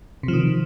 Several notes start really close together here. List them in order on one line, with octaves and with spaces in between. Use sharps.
C3 F3 D#3